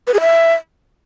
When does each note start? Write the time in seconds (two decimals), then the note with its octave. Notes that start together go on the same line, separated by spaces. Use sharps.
0.07 B4
0.14 G#4
0.21 E5